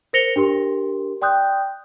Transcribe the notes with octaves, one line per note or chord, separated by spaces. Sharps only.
A#4 C5 A#6 C#7 F7 G7
D4 G4 A#4 C6
D5 G5 C6 D#6 F#6 G6